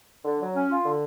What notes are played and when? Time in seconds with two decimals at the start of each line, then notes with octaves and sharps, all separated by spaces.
0.25 D3
0.40 F#3
0.55 C#4
0.70 F4
0.86 D3